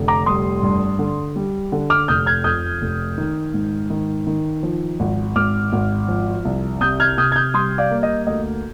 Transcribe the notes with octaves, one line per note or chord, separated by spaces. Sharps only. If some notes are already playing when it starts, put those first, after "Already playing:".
Already playing: F1 D3
A#5 D6
G3 C6 D#6
G2
D3
G3
D3
D6 F6
F1 D#6 G6
F6 G#6
F2 D#6 G6
F1
D#3
G#2
D#3
D#3
F3
G#1
G#1 D6 F6
G#1
F3
C2
C3 D#6 G6
F6 G#6
C3 D#6 G6
G#6
D#6 G6
G3 C6 D#6
D5 F5
A#3
D#5
D2 D#5